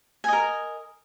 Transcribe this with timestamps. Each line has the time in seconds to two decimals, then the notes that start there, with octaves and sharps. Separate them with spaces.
0.24 G#5
0.28 D#5
0.33 A#4